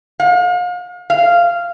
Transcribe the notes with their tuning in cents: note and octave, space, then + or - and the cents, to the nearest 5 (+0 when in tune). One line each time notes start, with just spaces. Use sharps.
F5 +40
F5 -10